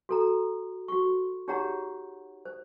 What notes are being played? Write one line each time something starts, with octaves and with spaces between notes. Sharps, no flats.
F#4 A4 A#5
F#4 C#6
D#4 G4 G#4 C#5 F#5 A#5
C5